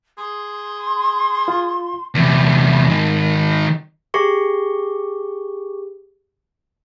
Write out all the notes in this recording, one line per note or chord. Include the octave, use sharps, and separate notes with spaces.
G#4 C6
F4
E2 C3
G#2 D#3
G4 G#4 C#6